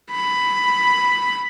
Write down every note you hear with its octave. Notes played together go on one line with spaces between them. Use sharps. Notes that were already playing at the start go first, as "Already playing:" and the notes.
B5